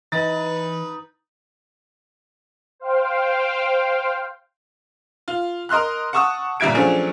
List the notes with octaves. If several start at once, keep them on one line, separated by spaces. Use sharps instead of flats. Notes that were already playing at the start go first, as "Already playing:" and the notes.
E3 D#4 B4 A6
C5 F5 G5
F4
A#4 D#5 C6 F6 F#6
F#5 A5 C#6 D#6 E6
G1 A#2 G3 E5 G#6 D7
F3 F#3 A3 C#4 D4 G#4